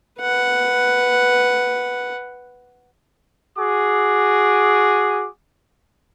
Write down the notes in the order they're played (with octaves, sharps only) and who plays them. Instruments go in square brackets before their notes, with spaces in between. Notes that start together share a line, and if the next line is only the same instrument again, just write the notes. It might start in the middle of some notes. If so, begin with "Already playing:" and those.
[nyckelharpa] B4 F#5
[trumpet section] F#4 G#4 D6